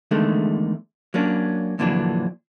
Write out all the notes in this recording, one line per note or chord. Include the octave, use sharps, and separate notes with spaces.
E2 D3 D#3 G#3 A3
F#3 A#3 C#4 D4
F2 A#2 D3 E3 F#3 D4